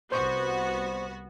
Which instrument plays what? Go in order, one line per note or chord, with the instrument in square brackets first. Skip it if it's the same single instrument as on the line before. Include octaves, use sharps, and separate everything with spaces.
[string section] C2 B3 F#4 [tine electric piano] C5 C#6